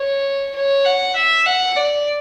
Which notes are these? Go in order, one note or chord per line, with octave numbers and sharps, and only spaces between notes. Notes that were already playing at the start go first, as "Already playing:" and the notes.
Already playing: C#5
C#5
F#5
E5
F#5
D5